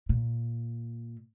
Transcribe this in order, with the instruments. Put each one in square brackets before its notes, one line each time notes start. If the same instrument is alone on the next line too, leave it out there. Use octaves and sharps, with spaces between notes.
[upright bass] A#2